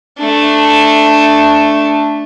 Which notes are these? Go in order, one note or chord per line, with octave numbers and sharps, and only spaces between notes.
A3 D4